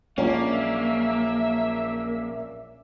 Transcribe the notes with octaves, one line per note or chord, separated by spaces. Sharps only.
A#1 F#3 G#3 A#3 C#4 D4 F4 E5